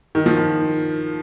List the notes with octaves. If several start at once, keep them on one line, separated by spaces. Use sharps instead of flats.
D#3
F3
D#3